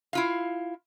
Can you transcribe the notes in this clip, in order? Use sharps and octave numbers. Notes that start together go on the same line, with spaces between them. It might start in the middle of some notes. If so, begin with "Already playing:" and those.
E4 F4 F5